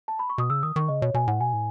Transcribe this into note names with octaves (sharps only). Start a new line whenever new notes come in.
A5
B5
C#6
B2 D#6
C#3 E6
D#3 D#6
D#3 C#6
C#3 D#5
B2 C#5
B2 G#5
A2 F#5
B2 G#5
A2